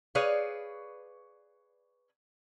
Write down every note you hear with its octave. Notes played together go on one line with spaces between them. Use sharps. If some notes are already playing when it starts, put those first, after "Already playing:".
G#4 B4 C#5 D5 F5